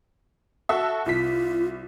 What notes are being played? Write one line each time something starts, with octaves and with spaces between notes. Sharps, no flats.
F#4 A4 E5
C2 F4 B6